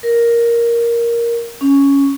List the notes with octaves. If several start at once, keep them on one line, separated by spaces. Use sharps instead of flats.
A#4
C#4